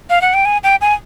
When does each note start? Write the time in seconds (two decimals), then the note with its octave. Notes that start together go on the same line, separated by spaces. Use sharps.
0.10 F5
0.22 F#5
0.34 G5
0.45 G#5
0.64 G5
0.81 G#5